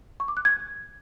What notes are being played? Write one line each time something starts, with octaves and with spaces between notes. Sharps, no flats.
C#6
D6
F#6
G#6